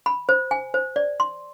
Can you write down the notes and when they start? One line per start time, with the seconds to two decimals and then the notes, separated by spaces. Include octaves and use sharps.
0.06 B5
0.29 C5
0.51 G#5
0.74 C5
0.96 D5
1.20 C6